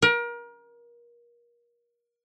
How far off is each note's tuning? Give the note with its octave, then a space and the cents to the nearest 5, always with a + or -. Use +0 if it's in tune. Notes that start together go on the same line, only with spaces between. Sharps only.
A#4 +30